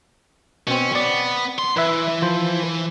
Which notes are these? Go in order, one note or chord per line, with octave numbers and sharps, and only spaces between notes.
B2 C4 C#4
B3 D5
C6
E3 B4 E5
F3 C5